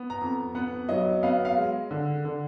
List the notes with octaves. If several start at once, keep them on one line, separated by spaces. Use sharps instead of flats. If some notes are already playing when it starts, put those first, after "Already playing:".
Already playing: B3
A#5
F2
B3 F#5
F#3 D#5
B3 F5
F5
G#3
D3
D3